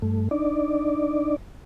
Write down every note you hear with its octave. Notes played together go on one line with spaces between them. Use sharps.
G2 A3
D4 D#4 D5